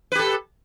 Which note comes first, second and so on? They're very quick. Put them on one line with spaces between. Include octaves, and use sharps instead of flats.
B4 G4 A4